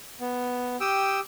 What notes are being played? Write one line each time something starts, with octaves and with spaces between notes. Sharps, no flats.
B3
G4 G5 D#6 E6